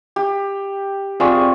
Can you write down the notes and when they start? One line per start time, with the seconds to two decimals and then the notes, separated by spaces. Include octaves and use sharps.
0.16 G4
1.20 C4 F4 G#4 D5 C#6